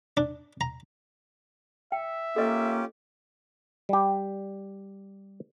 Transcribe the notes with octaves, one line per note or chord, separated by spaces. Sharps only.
D4
A#5
E5 G5
A#3 C#4 F4 G4 A4 D#5
G3 G4